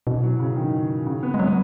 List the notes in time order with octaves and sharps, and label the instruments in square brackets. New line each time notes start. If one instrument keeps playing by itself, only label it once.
[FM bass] B2 [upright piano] E3
[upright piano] F#3
C#3
D#3
C#3
B3
[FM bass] G#3
[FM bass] F#3 [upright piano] B3